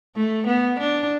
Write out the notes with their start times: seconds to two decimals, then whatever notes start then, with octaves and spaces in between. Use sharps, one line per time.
0.16 A3
0.48 B3
0.80 D4